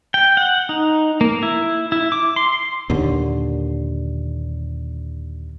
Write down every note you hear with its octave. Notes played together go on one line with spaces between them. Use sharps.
G5
F#5
D#4
A#3
E4
E4
D6
C6
D#2 A#2 D3